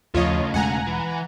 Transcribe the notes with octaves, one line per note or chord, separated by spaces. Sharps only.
D#2 C#3 F3 A3 F4 C#5 D#5
E1 G#3 F#5 G#5 A#5
E3